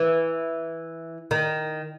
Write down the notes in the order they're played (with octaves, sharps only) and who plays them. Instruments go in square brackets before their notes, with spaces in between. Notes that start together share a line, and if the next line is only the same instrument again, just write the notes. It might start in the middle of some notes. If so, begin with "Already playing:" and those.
Already playing: [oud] E3
D#3